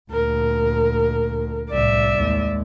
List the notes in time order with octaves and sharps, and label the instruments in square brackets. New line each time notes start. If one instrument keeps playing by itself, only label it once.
[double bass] D2 A#2 [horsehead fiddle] A#4
[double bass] C2 A2 [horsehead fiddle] D5 E5
[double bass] D#2 G#3